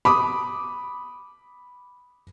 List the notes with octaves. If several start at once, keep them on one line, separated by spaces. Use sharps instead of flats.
B5 D6 D#6